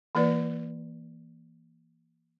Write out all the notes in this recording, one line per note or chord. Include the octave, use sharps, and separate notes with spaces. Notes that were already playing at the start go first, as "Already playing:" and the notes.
E3 A#3 E4 B4 D5